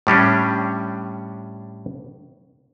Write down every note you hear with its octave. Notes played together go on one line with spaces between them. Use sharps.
A2 G3 C#4 D4